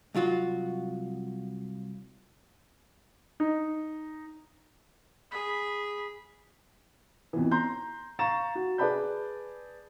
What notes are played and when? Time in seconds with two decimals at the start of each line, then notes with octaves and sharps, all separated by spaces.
0.14 C2 F#3 F4 F#4
3.40 D#4
5.31 G#4 B5
7.33 F2 B2 E3
7.51 A#5 C6 G6
8.19 F5 A#5 C#6 A6 E7
8.55 F#4
8.78 G#4 B4 D5 A5 B5 G6